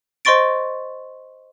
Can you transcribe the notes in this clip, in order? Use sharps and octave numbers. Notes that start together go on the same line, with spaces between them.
C5 D#5 C6 C#6 A6 D7